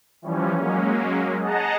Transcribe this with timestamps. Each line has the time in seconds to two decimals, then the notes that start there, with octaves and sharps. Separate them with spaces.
0.22 E3 F3 G3 C#4
0.56 F#3 G#3 A#3 C#4
1.39 G#4 D#5 F#5 A5 A#5